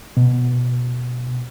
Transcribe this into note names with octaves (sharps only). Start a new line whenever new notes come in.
B2